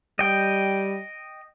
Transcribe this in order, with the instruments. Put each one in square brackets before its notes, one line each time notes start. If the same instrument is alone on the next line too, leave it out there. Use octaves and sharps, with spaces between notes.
[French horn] G3 [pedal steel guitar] D#5 G5